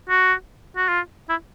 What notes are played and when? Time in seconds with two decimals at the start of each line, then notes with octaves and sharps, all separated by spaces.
0.09 F#4
0.76 F#4
0.88 F4
1.29 E4